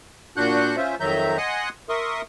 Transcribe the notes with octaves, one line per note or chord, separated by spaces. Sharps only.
A#2 D4 F#4 F#5 F#6 G6
C#4 F4 C5 E5
F2 D#3 F#3 E5 A#5 G6
D#5 F#5 G#5 C6 D#6 F#6
A#4 E5 C6 C#6 D#6